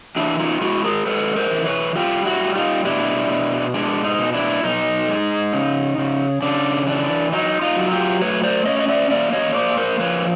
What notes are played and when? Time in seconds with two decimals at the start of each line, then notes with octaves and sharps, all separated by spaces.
0.16 E3 D4 E4
0.39 D#4 F4
0.61 G#3 E4 F#4
0.84 G#4 A#4
1.06 G#3 A4 B4
1.36 A#4 C5
1.51 E3
1.66 B4 C#5
1.95 G3 F4 G4
2.25 E4 F#4
2.41 G3
2.55 D#4 F4
2.85 B2 D4 E4
3.29 B2
3.74 G#3 D4
4.04 D#4
4.19 B2
4.34 D4 E4
4.63 B2 D#4
5.09 G#3
5.53 C#3
5.98 C#3
6.42 C#3 D4
6.87 E3 D4
7.32 F#3 D#4
7.62 D#4 F4
7.77 F#3
7.91 F4 G4
8.21 A3 B4 C#5
8.43 C5 D5
8.65 C#4 C#5 D#5
8.79 D#5
8.88 D5 E5
9.10 A#3 D5 E5
9.33 C#5 D#5
9.55 A#3 C5 D5
9.78 A#4 C5
9.99 F3 B4 C#5